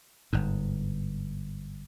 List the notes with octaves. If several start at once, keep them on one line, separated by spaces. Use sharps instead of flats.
G1 G#2